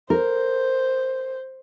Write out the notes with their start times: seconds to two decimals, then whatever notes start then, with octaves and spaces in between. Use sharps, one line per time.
0.10 A#4 C5